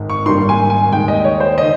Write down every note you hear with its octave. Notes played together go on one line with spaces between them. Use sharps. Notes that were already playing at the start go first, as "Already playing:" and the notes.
Already playing: G#1 G#2
C#6
G#1 G#2 G3 A#3 D#4 C6
G#5
G#5
D#2 D#3 G#3 G5
D#5
C#5
C5
D#3 D#5